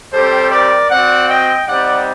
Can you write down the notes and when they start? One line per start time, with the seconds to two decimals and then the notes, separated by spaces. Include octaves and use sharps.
0.13 G3 C4 G4 A4 C5
0.52 A#4 D5
0.90 C4 F#4 D5 F#5
1.28 D#5 G5
1.67 G3 C4 D#4 D5 F#5